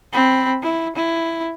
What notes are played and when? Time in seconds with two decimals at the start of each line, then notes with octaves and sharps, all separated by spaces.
0.13 C4 B5
0.63 E4
0.96 E4